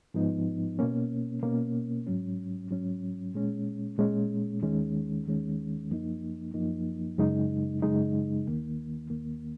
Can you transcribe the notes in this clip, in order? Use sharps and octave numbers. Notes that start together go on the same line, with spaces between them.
G#2 F3 B3 D#4
B2 A#3 C#4
B2 A#3 C#4
G#2 F#3 C#4
G#2 F#3 C#4
A#2 G#3 C#4
A#2 G#3 C#4
D#2 D#3 G#3 C#4
D#2 D#3 G#3 C#4
F#2 F3 A#3 D#4
F#2 F3 A#3 D#4
F#2 C#3 G#3 D#4
F#2 C#3 G#3 D#4
D#2 D#3 A#3
D#2 D#3 A#3